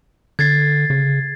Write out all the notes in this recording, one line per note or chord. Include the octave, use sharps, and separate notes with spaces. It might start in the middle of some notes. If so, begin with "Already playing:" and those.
D3 G#6 A6 C7
C#3